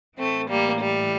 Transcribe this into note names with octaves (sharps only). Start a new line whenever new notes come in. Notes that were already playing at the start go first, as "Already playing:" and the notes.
A2 E3 A3 C4
G3 A#3
G3